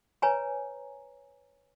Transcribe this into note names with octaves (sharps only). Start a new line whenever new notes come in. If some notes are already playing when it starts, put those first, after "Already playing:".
B4 C#5 G#5 A#5